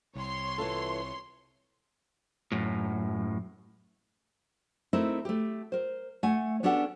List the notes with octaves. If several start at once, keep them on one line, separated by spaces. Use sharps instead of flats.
C2 C#5 C6
E3 F4 A4
F#2 A2
A3 C4 D#4 E4 A#4
A3 G4
A#4 C5
A3 F#5 G#5
B3 C#4 D4 G4 A4 F#5